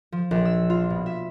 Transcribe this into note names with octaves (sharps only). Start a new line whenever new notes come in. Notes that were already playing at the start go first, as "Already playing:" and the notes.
F3
A#1
E6
F4
B2
E5